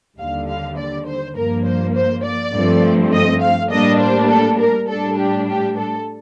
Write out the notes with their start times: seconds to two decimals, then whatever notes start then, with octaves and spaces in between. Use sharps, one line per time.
0.18 D#2 D3 G3 F5
0.48 F5
0.77 D5
1.07 C5
1.36 G2 F3 A#3 A#4
1.65 C5
1.95 C5
2.24 D5
2.53 G2 F3 A3 C4
3.13 D#5
3.42 F5
3.71 A2 G3 A#3 D4 D#5
4.00 C5
4.30 A4
4.59 A#4
4.89 A2 G3 D4 A4
5.18 G4
5.48 G4
5.77 A4